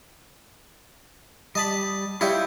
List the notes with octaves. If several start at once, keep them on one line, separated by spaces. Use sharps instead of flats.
G3 D#5 A5 B5
G3 E4 F4 C#5 D#5 G5